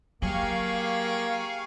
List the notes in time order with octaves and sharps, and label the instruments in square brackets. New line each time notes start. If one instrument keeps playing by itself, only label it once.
[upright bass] F#3 [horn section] A#3 [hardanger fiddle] G4 G#4 [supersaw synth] F5 C#6